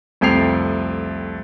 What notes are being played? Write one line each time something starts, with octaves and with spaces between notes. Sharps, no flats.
C2 F2 A3 G5 C7 F7